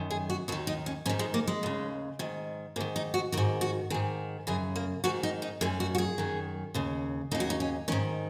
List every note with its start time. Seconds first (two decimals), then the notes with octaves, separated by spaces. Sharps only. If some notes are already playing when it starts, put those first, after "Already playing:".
Already playing: F#2 D#3
0.10 G#4
0.30 F#4
0.48 D#2 F#4
0.52 D#3
0.67 D#4
0.86 C#4
1.06 G#2 C#4
1.09 D#3
1.19 G#3
1.34 A#3
1.47 G#3
1.63 D#2 C#3
2.19 G#2 D#3
2.76 G#2 A#3
2.80 D#3
2.96 D#4
3.14 F#4
3.32 G#2 D#3 F#4
3.61 F#4
3.90 D#3 G#4
3.94 G#2
4.47 F#2 C#3 G#4
4.76 A#3
5.04 G#2 D#3 F#4
5.23 D#4
5.42 D#4
5.61 F#2 D#3 G#4
5.80 F#4
5.95 F#4
5.98 G#4
6.18 F#2 D#3
6.74 D#2 C#3
7.31 D#2 C#3 D#4
7.40 F#4
7.50 D#4
7.60 C#4
7.88 D#3 C#4
7.92 G#2